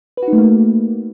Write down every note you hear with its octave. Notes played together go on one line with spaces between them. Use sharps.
B4
F#4
D#4
A3
A#3